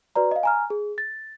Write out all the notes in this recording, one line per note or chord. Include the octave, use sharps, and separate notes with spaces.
F#4 B4 D5 A#5
D#5 F5
G#5 A#5 F6
G#4
A6